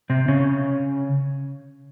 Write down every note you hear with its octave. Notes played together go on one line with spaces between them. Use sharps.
C3 C4
C#3 C#4